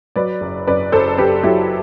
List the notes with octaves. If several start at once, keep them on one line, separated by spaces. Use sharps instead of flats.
F#3 B4 D5
F#1
F#2 B4 D5
F#1 A4 C5
F#1 G4 B4
F#3 E4 G4